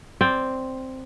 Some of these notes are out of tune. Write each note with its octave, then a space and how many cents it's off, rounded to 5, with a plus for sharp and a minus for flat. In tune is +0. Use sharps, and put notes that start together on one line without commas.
C4 +0 D5 +0